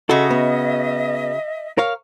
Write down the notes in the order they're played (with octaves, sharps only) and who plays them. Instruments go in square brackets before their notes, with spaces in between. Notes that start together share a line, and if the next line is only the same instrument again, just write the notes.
[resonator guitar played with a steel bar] C#3 F#4 [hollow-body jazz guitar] A4 [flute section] D#5 E5
[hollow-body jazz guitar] B3
A#4 C#5 F5